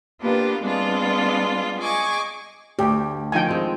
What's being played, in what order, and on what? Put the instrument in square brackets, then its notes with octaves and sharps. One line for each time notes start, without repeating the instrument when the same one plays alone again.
[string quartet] A#3 B3 D4 F4 G4 B4
G3 G#3 B3 C4 D4 F4
G#4 D#5 G#5 C#6 D6
[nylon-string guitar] D2 [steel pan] G4
[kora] D#3 F3 D#4 [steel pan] G5 G#5
[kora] G#3 C4